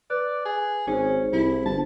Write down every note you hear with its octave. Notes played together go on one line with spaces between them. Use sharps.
B4 D5 F#6
G#4
G#1 C#4 G#4 C5
C2 E4
G1 A5